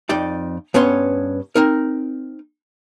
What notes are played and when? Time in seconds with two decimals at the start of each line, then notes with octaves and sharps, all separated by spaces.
0.09 F2 D#4 D5 G5
0.74 G2 B3 C#4 C#5 C6
1.55 C4 D#4 A#4